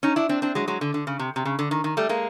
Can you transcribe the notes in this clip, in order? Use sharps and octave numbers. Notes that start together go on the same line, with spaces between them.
C#4 D#4
D4 E4
C4 D4
C4 D4
F#3 G#3
F#3 G#3
D3
D3
C#3
C3
C3
C#3
D3
D#3
D#3
G3 A3
G#3 A#3